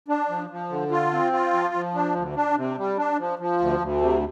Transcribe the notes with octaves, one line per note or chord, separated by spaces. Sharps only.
D4
F3
F3
D3
F4
C4
F4
F3
F3
D4
D2
D4
C3
G3
D4
F3
F3
D2
D2
C3